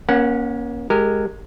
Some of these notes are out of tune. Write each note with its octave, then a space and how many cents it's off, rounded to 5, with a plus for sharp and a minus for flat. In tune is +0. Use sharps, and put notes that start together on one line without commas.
A#3 +35 C#4 +0 F#5 +0
G#3 +0 G4 +0 A#4 -25